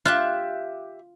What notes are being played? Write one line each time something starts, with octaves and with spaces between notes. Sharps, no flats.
F4 G4 E5 F#6